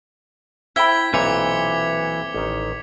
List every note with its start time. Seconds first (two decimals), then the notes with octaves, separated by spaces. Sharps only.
0.76 E4 C5 G5 B5 G#6 B6 G7
1.14 B1 A#2 E3 C4 D6 C#7 F7
2.34 A1 D#3